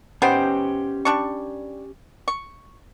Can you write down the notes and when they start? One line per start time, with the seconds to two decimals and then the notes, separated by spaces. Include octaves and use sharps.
0.22 B3 C#4 D#4 G4 C5 G5
1.05 G3 D4 C#6
2.28 C#6